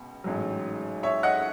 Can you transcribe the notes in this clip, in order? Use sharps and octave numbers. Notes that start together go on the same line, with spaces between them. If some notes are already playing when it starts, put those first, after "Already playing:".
Already playing: C#2 B2
A1 G#2 F#3
C#5 E5
D#5 F#5